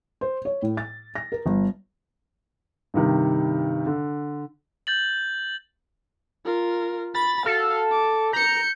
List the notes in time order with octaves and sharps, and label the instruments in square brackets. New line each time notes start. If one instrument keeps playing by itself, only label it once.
[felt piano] C5
C#5
A2
A6
A#6
A#4
G1
[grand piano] G2 C3 D#3
D3
[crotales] G6 A6 F#7
[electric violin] F4 A#4
[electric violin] B5 [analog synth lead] A6
[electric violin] F#4 F5 [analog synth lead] A4
[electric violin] D6
[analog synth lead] A#5 [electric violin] G6 C#7